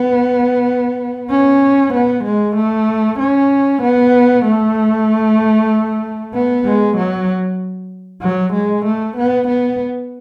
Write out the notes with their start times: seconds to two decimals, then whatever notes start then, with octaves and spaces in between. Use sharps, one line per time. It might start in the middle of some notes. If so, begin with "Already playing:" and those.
Already playing: B3
1.31 C#4
1.94 B3
2.25 G#3
2.56 A3
3.20 C#4
3.82 B3
4.46 A3
6.34 B3
6.65 G#3
6.97 F#3
8.22 F#3
8.53 G#3
8.85 A3
9.17 B3
9.48 B3